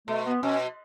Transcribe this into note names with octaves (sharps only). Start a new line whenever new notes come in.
B2 A3
B3
B2 C#4